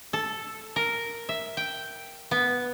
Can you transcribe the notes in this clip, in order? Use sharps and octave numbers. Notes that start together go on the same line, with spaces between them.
A4
A#4
E5
G5
B3